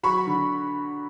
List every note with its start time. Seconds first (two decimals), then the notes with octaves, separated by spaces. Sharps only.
0.03 F#3 B5 C#6
0.27 D3